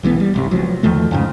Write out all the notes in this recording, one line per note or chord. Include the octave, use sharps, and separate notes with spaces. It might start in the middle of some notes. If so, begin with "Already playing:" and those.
B1 E3 G3 B3
G3
G1 C2 C3
C#2 F3 F#3
E2 D#3 F3 A3
F2 G#2 C#3